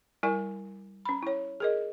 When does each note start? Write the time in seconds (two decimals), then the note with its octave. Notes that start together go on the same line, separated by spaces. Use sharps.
0.23 G3 E4 A#4 D5 G#5
1.05 C#4 B5
1.23 E4 C#5
1.60 G#4 A#4 D#5